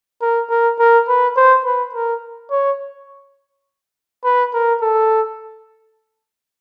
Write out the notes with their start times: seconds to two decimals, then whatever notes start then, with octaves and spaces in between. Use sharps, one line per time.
0.22 A#4
0.50 A#4
0.79 A#4
1.08 B4
1.37 C5
1.65 B4
1.94 A#4
2.51 C#5
4.24 B4
4.54 A#4
4.82 A4